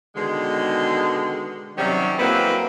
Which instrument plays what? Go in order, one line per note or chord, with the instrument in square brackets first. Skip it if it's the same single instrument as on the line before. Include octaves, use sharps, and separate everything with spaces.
[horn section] B2 D3 D#3 G#3
C3 D#3 F#3 G3 C#4
F#3 G#3 A#3 C4 E4 B4